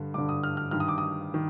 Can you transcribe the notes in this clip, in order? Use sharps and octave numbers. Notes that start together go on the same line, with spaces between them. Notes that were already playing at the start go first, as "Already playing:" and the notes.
Already playing: G2 D3
G2 D3 D6
D#6
F6
F6
G2 D#3 F6
D#6
D6
D#6
D#3